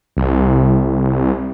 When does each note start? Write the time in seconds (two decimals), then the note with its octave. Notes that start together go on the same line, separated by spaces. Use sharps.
0.17 C2